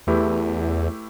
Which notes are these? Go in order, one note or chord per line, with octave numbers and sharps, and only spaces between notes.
E2 A3 E4 G4 B4